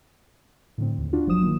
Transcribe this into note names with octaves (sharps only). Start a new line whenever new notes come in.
A2 D3 C4
D#2
D4 F4 F#4
G1 F3 F#3 C5 D#6 E7
D#3 A#3